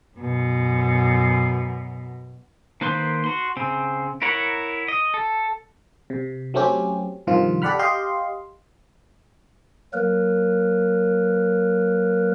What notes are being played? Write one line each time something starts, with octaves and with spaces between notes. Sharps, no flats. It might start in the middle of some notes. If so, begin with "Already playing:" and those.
F#2 B2
D#3 A#3 B4 C5 C6
F#4 C6
C#3 C4
E4 A#4 C#5 F#5
D#5
A4
C3
F#3 A3 C4 C#4 G4
G2 C3 D#3 F3 F4
G4 A4 D5 F#5 B5 F6
G4 D#5 F5 C6
F#3 A#3 A#4 B4